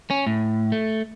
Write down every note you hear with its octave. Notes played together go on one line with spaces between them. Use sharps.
C#4
A2
A3